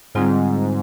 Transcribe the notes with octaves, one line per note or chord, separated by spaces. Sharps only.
G#2 D3 G3 C4 F4